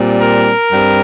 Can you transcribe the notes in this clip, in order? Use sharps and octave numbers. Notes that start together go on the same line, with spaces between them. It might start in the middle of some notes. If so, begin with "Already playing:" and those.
Already playing: A#2 G3 C4
A#4
G2 G3 C4